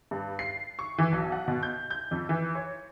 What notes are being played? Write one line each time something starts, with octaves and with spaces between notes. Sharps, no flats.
G2
C7
C#6
E3
B1
F#5
B2
G6
G6
F2
E3
C#5